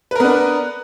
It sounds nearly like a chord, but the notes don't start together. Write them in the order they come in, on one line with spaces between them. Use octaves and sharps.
B4 A#4 B3 D4